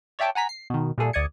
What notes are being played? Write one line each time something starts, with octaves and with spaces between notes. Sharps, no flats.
C#5 D5 E5 G5 A5 D6
F#5 G#5 A#5 B6
C7
B2 D#3
A#2 G3 A3 G#4 A4
D2 D5 D#6 G#6 C#7